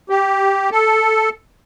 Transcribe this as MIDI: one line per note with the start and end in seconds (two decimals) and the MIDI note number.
0.09 0.70 67
0.71 1.30 69